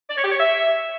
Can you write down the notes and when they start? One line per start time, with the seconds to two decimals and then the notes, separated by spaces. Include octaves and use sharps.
0.10 D5
0.17 C#5
0.24 G4
0.32 C#5
0.39 E5